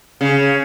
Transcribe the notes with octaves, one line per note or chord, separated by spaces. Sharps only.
C#3